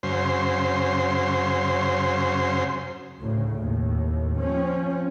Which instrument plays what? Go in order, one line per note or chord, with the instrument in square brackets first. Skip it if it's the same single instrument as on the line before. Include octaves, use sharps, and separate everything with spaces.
[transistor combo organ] F#2 C#3 C5
[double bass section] D2 A2 C#3
D#2 A2
F3 C4 C#4